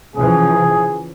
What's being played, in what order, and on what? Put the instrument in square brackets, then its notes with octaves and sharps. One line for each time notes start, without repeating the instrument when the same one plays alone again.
[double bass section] C#3 E3 F3 [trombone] G#4